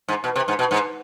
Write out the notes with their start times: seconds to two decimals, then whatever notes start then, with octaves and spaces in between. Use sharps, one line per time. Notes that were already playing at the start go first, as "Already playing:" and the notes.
0.08 G#2
0.24 B2
0.36 C3
0.48 G#2
0.59 B2
0.71 G#2